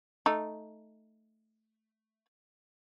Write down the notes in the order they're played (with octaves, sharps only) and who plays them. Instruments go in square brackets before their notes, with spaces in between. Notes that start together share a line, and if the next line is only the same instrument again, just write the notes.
[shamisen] A3 D#4